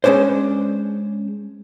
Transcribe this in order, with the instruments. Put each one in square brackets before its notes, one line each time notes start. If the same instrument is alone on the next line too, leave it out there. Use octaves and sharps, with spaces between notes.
[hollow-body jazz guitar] G#3 A#3 C#4 D4 C5